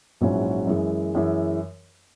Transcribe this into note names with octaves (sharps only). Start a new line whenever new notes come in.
A#1 G#2 F#3 C#4 E4
F#2 E3 G#3
F#2 E3 G#3